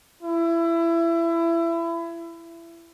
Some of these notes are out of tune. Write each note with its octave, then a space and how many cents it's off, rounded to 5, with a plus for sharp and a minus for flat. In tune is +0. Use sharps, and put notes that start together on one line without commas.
E4 +25